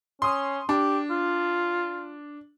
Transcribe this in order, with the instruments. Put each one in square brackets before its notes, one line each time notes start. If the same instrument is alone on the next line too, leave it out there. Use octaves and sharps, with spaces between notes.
[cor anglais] C#4 [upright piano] C6 D#6
[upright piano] D4 [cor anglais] G4
[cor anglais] F4